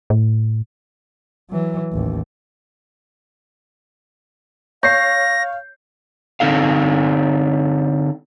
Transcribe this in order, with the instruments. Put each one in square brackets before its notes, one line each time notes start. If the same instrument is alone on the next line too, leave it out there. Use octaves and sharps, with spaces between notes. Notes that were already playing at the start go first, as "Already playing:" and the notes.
[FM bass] A2
[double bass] E3 F#3
A1 D#2
[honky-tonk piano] C#5 C7 [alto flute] F5 [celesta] G6 [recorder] A#6
[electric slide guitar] D3 C4 D#4 A4 F5